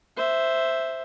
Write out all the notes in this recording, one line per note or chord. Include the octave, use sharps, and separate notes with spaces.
C5 E5